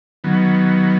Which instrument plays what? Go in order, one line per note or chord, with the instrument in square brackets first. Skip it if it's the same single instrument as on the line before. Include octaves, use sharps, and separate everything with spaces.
[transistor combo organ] D#3 F#3 B3